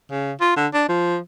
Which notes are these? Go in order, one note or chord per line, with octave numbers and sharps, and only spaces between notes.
C#3
F4
D3
D4
F3